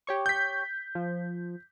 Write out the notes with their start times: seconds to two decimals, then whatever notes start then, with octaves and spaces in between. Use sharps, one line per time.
0.07 G4 C#5 C#6
0.26 G6 B6
0.95 F3